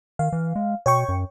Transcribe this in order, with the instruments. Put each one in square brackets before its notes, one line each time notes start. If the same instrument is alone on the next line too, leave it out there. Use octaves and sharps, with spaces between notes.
[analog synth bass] D#3 [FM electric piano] F5
[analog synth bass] E3
G#3
[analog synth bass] B2 [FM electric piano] C#5 G5 C#6
[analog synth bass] F#2